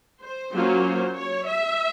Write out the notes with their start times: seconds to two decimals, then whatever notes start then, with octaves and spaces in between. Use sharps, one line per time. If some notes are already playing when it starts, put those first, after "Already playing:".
0.22 C5
0.53 F#3 A#3 C#4 F4
1.16 C#5
1.47 E5